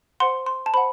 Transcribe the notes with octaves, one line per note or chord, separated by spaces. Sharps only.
C5 F#5 C6
C6
A5
C5 F#5 B5